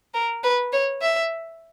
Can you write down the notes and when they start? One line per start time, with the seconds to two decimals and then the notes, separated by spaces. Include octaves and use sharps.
0.14 A#4
0.43 B4
0.73 C#5
1.02 E5